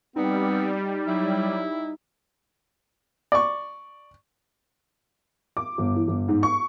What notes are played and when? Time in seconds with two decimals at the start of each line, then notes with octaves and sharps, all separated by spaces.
0.16 G3 B3 C4 D#4
1.07 F#3 E4
3.32 D5 C#6
5.57 D6
5.78 G1
5.96 E3
6.08 G1
6.28 G#2
6.43 C#6